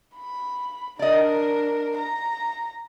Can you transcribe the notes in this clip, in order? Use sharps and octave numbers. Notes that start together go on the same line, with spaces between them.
B5
D4 A#4 D5 D#5
A#5